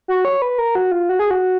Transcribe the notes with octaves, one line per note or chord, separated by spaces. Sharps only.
F#4
C#5
B4
A#4
F#4
F4
F#4
G#4
F#4